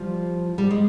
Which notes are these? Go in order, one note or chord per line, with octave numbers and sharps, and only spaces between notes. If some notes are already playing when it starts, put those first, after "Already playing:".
Already playing: F3 G3
G3
G#3